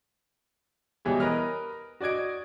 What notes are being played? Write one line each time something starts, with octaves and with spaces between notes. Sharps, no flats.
B2 E3 G3 G#3 C#5
A#4 B4 D#5 F6
F#4 D5 D#5 G#6 D7